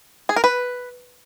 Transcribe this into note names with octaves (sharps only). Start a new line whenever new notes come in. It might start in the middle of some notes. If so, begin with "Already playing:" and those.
G#4
A#4
B4